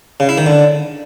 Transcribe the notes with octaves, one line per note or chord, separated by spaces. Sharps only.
C#3
E4
D#3
D3